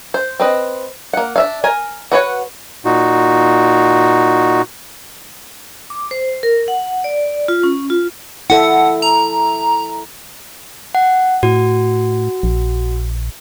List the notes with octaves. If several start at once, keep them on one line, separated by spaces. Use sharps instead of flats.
C5
C4 B4 D#5
A#3 F#5
D4 E5 F5
A#4 G#5
F#4 B4 C#5 F#5
A#2 D#4 F#4
D6
C5
A#4
F#5
D5
F4
C#4
F4
E4 A4 E5 F#5
A#5
F#5
A2 F#4
A#1